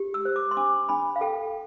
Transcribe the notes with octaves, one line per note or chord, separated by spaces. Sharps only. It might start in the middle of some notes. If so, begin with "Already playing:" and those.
Already playing: G4
E6
C5
D6
C6
D4 D6
D4 B5
F5
A4 G5